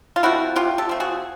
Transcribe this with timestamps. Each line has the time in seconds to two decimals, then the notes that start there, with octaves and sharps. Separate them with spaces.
0.16 F4
0.23 F3 A3 C4 E4 F#4
0.56 C3 F4 G4
0.78 G4 A4
0.89 F3 A3 C4
1.00 F#4 G#4